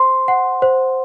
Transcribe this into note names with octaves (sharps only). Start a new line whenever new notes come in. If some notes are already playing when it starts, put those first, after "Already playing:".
Already playing: C5 C6
F#5
C5